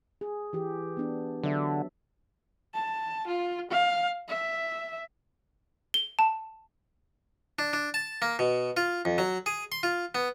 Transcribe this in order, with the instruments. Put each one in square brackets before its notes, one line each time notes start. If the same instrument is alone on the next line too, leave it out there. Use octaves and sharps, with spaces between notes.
[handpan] G#4
E3 G4
B3 D4
[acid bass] D3 [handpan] F#3 D4 E5
[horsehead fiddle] A5
F4
F5
E5
[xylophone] G7
A5
[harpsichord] D4
D4
A5
A#3
B2
F4
F2
F#3
G#4
C6
F4
B3